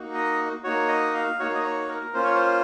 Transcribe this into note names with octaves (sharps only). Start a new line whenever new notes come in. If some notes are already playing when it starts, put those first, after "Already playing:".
Already playing: A#3 D#4 F#4
D#5
A#3 D#4 F#4 C#5
D#5
F5
A#3 D#4 F#4 C#5
D#5
C#5
A#4
A#3 C#4 F4 C5
C#5
C5